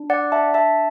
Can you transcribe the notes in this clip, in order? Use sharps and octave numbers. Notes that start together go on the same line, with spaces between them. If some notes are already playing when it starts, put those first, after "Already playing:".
Already playing: D4
D5 F#5
E5 A5
E5 A5